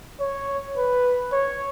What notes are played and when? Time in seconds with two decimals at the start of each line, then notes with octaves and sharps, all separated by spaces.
0.20 C#5
0.77 B4
1.32 C#5